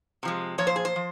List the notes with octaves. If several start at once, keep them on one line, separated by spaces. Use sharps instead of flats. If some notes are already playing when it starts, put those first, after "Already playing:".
C3 F3 G#3
A#2 F3 C#5
C5
G#4
C5
F3